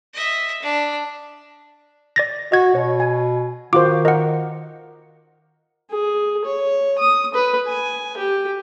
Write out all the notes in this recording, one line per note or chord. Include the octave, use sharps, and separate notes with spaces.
D#5 E5
D4
D5 A6 A#6
F#4 D#5 G#6
B2 C#5
G#5
D#3 F4 F#4 C5 D6
A#4 D#5 F#5
G#4
C#5
D#6
B4
G#5
G4